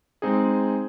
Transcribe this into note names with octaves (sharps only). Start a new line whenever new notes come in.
G#3 C4 D#4 G#4